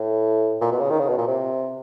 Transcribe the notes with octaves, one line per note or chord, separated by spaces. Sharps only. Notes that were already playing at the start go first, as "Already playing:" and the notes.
Already playing: A2
A#2
B2
C#3
D#3
C#3
B2
A#2
C3